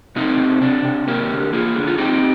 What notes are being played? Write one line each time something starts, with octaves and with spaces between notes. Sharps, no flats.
C3 C4 D#4
C3
C3 D4
C3
A#3 G4 A#4
D3
A#3 F4 G#4
D3
F4
C4 D#4 G4